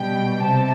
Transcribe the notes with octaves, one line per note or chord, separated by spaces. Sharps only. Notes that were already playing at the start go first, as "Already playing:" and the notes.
Already playing: B2 G3 G5
C3 A5